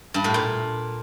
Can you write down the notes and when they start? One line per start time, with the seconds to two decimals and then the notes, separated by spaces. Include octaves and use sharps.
0.14 G2
0.24 A2
0.34 A#2